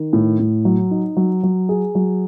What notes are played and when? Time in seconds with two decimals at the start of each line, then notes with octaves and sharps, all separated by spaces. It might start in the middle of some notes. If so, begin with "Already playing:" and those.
Already playing: D#3
0.13 A2
0.39 A2
0.65 F#3
0.91 D#4
1.17 F#3
1.43 F#3
1.69 G#4
1.95 F#3